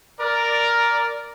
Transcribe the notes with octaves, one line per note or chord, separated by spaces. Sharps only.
A#4 D5